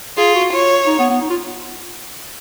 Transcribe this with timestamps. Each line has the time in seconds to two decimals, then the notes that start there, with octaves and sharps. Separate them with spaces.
0.17 F4 G#4
0.35 F#4
0.52 F4 C#5
0.86 D#4
0.99 B3
1.10 B3
1.21 D#4
1.30 F4